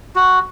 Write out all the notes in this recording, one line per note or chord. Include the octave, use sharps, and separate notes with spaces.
F#4